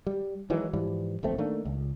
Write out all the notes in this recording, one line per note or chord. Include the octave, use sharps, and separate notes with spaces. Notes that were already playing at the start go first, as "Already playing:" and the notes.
G3
D#3 E3 F#3 G#3
G#2 E3 F3 G3
D1 A#1 A3 C4
D#3 A3 A#3 D4
C#2